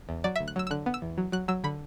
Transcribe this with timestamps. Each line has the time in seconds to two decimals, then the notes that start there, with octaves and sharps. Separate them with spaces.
0.09 E2
0.24 F#3 D5
0.36 D2 E5
0.48 F#6
0.56 F#3 E6
0.67 E6
0.71 D3 F#6
0.86 B3
0.94 E6
1.02 E2
1.18 F#3
1.32 F#3 F#6
1.48 F#3 E6
1.64 D3 B5